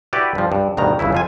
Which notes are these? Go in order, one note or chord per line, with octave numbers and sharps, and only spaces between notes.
E4 F#4 G4 B4 D5
G2 F3
G2
D2 G2 B2 D#3 A#5
G1 E2 C#3 E4
F2 F4 G#5